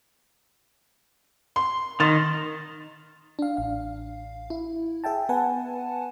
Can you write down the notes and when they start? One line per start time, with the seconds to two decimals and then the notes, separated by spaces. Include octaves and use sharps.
1.56 C6
2.00 D#3 C6 A6
3.39 D4 F5
3.57 A1 F5
4.50 E4
5.04 G#4 E5 G5 A5
5.29 B3 B4 F#5 G#5 A5